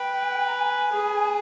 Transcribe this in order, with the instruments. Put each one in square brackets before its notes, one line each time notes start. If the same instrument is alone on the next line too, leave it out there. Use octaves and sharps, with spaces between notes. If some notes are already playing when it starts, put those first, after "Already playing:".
Already playing: [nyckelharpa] B4 [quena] G5
[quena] A#5
G#5
[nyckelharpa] G#4